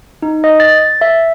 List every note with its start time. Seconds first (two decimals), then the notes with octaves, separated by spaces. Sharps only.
0.22 D#4
0.44 D#5
0.60 A6
0.78 A6
1.01 E5